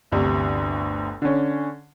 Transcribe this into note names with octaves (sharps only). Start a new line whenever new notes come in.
G1 D2 C3
D3 C#4